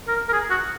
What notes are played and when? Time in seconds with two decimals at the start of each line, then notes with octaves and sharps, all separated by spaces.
0.08 A#4
0.29 A#4
0.33 G#4
0.50 F#4